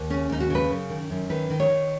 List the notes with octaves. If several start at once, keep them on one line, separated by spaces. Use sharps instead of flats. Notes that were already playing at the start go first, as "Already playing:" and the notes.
Already playing: D#2
C#3 C#4
D#2 D#4
F#4
C#3 B4
F#2
D#3
F#2
D#3 B4
D#3
C#5
D#3